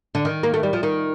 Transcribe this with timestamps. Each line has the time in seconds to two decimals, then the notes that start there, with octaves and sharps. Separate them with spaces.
0.15 D3
0.25 D#3
0.43 A#3
0.54 A3
0.63 G3
0.73 F3
0.83 D#3